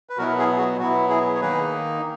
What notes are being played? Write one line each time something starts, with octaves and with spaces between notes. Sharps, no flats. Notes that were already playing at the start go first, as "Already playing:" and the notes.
B4
B2 F#3 B3 E4 F#4 A#4
E4 G#4
F#4
B2 F#3 B3 E4 F#4
E4 G#4
C#5
D#3 A#3 D#4 G#4 B4